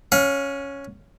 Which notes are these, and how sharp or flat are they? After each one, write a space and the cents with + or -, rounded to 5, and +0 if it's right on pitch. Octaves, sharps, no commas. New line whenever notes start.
C#4 +0 F5 +40